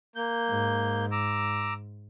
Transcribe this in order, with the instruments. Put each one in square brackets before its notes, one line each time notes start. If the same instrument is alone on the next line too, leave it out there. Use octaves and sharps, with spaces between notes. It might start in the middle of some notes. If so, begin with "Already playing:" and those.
[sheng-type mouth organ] A#3 G6
[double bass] G#2
[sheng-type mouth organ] A#5 D6 E6